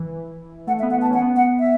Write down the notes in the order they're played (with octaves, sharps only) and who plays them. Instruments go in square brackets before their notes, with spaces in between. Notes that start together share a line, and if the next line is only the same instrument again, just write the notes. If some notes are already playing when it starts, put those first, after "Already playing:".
Already playing: [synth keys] E3
[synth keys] A3 [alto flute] F#5
[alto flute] E5
[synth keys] B3
[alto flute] F#5
[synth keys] B3 [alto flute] A5
[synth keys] C#4 [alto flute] F#5
[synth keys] B3
[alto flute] F#5
E5